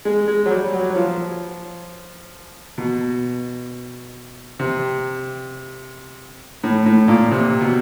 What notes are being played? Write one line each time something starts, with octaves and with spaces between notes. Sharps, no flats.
G#3
G#3
F#3
G3
F#3
F#3
F3
B2
C3
A2
A2
A#2
C3
B2